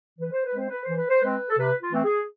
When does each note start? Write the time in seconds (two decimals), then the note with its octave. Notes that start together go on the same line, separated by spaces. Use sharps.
0.18 E3 B4
0.31 C5
0.44 B4
0.54 G#3 C4 C5
0.70 B4
0.82 C5
0.88 E3
0.95 B4
1.09 C5
1.20 G#3 C4 B4
1.49 A4
1.57 C3 B4
1.81 F4
1.92 E3 A3 C4
2.04 G#4